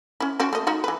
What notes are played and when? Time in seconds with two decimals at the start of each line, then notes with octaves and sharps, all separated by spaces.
0.20 C#4 E4
0.40 C4 C#4 F#4
0.53 A3 A#3 D#5
0.67 D#4 F4 F#4
0.84 E3 B4